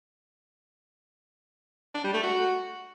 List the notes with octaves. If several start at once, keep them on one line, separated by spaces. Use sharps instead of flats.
D4
G3
A3
F#4